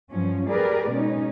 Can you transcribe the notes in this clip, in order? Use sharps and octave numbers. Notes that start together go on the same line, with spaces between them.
G2 F3 F#3 C#4
G4 G#4 A#4 B4 D5
B2 G#3 C#4 D#4